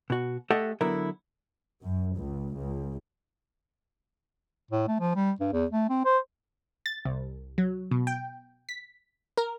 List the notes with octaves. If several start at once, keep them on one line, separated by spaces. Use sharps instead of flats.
B2 F#4
A3 G4 A4 D#5 E5 F#5
D3 F#3 B3 E4 A#4
F#2
C#2
C#2
A2
A3
F3
G3
G2
E2
A3
C4
C5
A6
C2
F#3
B2
G5
B6
A#4